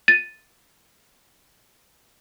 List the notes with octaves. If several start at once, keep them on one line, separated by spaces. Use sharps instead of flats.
A6 D#7